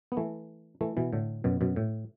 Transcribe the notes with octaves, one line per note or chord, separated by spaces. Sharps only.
B3
E3 A3
E3 A3
B2 E3
A2 D3
F#2 B2
F#2 B2
A2